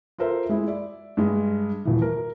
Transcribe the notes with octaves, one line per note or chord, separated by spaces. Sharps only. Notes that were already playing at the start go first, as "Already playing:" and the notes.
F4 A4 A#4 C5 E5
G#3 E4
D5 E5
G2 G#3
D#1 E3
A#4